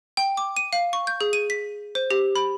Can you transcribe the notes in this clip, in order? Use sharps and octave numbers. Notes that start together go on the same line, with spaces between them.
G5
D6
D#7
F5
C#6
G6
G#4
D#7
B6
C5
G4
B5